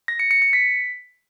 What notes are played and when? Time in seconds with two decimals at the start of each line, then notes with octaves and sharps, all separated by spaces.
0.08 A#6
0.19 C#7
0.31 C#7
0.42 C#7
0.53 B6